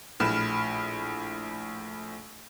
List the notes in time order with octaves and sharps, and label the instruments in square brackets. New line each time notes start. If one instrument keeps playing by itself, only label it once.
[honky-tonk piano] A#1 A2 B5 F6 E7